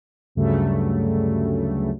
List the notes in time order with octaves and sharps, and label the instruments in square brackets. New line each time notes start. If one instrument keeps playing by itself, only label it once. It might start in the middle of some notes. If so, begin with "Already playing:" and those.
[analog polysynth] D2 G2 C#3 F#3 A3